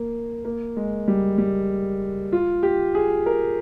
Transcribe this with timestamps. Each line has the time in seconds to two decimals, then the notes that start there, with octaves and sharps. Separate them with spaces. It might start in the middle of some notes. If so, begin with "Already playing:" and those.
Already playing: A#3
0.45 A#3
0.76 G#3
1.08 G3
1.38 G3
2.32 F4
2.63 G4
2.95 G#4
3.26 A#4